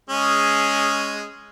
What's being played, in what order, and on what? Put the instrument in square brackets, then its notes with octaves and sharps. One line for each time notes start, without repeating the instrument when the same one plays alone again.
[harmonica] G#3 C#4 G#4